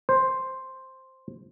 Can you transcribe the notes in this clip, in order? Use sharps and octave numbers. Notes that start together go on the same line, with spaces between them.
C5